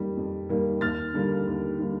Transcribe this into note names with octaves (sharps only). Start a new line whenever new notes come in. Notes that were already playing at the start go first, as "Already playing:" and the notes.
Already playing: F2 D#3 G3 A#3
F2
D#3 G3 A#3
D#2 F6 A6
D3 G3 A#3
D#2
D3 G3 A#3